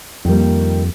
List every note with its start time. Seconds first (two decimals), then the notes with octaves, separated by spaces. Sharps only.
0.25 F2 D#3 G3 A#3